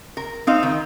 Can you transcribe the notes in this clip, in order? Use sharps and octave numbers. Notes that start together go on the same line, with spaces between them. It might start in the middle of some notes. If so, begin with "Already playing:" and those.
A#4
C4 D#4 F5
D#3